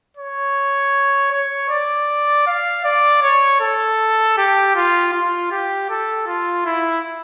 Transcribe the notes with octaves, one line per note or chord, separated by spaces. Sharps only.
C#5
C#5
D5
F5
D5
C#5
A4
G4
F4
F4
G4
A4
F4
E4